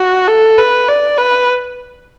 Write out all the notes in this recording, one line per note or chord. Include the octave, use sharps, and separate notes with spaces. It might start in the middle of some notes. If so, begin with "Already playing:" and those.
Already playing: F#4
A4
B4
D5
B4